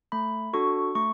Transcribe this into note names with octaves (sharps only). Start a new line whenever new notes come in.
A3 B5
D4 F#4 A4 C#6
A3 C#6